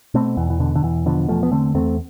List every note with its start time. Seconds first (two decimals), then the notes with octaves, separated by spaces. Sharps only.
0.14 B2 A3 C4
0.37 E2 E3
0.50 E3
0.60 B2 D3
0.76 D3
0.83 E2 E3
1.06 B2 D3 F3
1.29 E2 F3 A3
1.43 B3
1.52 D3 A3 C4
1.74 E2 A3 C4